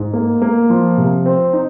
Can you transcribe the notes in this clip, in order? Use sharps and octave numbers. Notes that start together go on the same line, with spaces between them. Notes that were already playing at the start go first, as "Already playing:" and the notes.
Already playing: G#2
A#3
A#3
F3
C3
C4
D#4